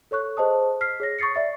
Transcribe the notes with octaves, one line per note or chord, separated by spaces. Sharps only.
A4 C#5 C#6 F#6
G#4 C5 D#5 A5 D#6
F6 B6 C7
G#4 C#5 A#6
C#6 D#6 A6 C7 C#7
D5 E5 A6